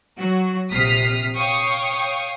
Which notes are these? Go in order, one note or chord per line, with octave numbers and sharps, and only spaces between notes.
F#3 F#4
A#1 C3 D#6 F6 B6 C7
C#5 F5 G5 C#6 D#6